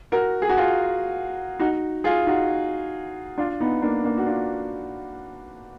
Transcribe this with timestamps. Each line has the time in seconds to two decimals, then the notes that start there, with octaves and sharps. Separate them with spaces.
0.12 F#4 A#4
0.42 G#4
0.49 F#4
0.57 F4 G#4
1.60 D#4 F#4
2.04 F4 G#4
2.27 D#4 F#4
3.38 D4 F4
3.60 B3 D#4
3.82 A#3 D4
4.05 A#3 D4
4.18 F#4
4.26 D4 F4